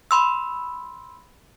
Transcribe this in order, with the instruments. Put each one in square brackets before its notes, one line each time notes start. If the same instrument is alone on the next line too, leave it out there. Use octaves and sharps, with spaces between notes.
[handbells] B5 C6 E6